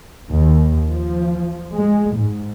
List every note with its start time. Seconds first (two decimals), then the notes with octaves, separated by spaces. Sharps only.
0.30 D#2
0.89 F3
1.76 G#3
2.18 G#2